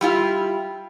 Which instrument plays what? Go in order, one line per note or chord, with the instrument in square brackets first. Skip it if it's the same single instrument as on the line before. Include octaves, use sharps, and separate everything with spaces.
[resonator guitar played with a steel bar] G3 E4 F4